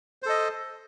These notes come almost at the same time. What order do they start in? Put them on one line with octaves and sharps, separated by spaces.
C5 A4 D#5